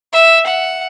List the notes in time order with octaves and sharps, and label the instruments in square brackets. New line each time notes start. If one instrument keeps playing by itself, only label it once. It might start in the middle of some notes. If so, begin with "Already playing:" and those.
[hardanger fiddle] E5
F#5